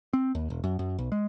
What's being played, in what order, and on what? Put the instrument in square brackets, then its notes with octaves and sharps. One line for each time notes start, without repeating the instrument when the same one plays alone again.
[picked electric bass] C4
D#2
E1
F#2
F#2
B1
G#3